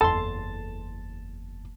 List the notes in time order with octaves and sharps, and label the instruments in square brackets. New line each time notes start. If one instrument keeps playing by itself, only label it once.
[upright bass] F#1 E2 [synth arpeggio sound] A4 C6 [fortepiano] A5